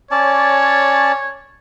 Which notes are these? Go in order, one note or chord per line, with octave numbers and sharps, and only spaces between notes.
C#4 C#5 D5 A5